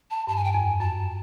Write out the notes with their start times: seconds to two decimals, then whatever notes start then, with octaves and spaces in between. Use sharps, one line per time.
0.11 A5
0.27 G2 A5
0.36 G#5
0.44 G5
0.52 F2 G#5
0.80 F#2 A5